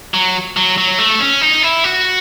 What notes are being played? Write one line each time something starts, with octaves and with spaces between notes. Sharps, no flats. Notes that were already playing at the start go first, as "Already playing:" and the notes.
F#3
F#3
F#3
A3
C#4
D#4
E4
F#4